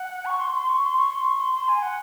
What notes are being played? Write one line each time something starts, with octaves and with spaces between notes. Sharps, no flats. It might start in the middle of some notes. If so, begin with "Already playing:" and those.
Already playing: F#5
C#6
C6
C6
C#6
C6
C#6
C6
C#6
C6
C6
G#5
F#5